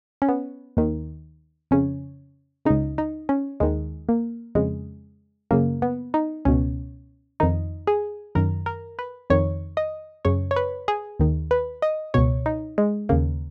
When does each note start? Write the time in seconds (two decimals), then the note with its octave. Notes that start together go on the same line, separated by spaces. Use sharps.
0.22 C#4
0.29 B3
0.77 D#2 D#3
1.71 F2 C#3 C#4
2.65 C#2 C#3 D#4
2.98 D#4
3.29 C#4
3.60 D#2 D#3 G#3
4.09 A#3
4.55 F2 C#3 G#3
5.51 F#2 C#3 A#3
5.82 B3
6.14 D#4
6.45 C#2 B2 C#4
7.40 F2 D#3 D#4
7.87 G#4
8.35 F#2 D#3 A#4
8.66 A#4
8.99 B4
9.30 F2 D#3 C#5
9.77 D#5
10.25 F#2 C#3 C#5
10.51 C#5
10.56 B4
10.88 G#4
11.20 D#2 D#3
11.51 B4
11.82 D#5
12.14 C#2 B2 C#5
12.46 D#4
12.78 G#3
13.09 D#2 C#3 A#3